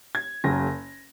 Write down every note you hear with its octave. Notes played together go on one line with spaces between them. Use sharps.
G#6
F#1 F#2 C#3 F#3 A#3 A#6